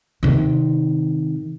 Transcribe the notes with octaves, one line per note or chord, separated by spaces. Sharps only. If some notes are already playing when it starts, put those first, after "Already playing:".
C3 D#3